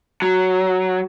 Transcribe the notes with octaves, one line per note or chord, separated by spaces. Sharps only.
F#3